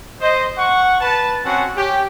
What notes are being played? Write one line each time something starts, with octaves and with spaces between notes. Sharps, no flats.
C5 D#5
F#5 C#6
B4 A5
C4 C#4 F#4 F#5 A5
C#4 G4